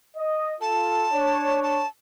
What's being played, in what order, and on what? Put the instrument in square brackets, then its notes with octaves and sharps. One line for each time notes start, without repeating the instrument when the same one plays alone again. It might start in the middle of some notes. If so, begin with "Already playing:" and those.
[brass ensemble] D#5
[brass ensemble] F4 A4 [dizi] A5
[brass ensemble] D4 C#5
[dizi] A5